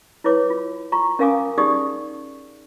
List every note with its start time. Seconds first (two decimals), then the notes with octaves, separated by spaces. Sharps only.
0.24 E4 B4 C#5 D6
0.50 F4
0.92 F4 A#5 C#6
1.19 C#4 A#4 F5 G#5 D6 D#6
1.58 D#4 G4 G#4 D5 C#6 D#6